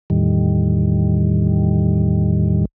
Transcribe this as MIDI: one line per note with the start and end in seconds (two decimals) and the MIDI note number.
0.10 2.65 40
0.10 2.65 45
0.10 2.65 51
0.10 2.65 55